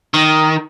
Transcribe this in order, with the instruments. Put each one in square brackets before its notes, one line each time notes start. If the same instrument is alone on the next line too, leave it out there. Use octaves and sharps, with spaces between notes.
[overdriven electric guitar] D#3